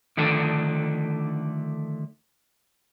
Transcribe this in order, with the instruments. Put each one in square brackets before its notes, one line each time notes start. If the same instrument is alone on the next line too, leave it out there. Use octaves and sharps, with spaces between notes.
[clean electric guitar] D3 D#3 F3 A3 D4 A4